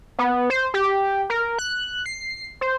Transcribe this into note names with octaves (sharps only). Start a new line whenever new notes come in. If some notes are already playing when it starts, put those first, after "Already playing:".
B3
C5
G4
A#4
F#6
C7
C5